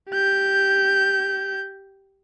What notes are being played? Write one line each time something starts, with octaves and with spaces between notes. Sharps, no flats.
G4 G6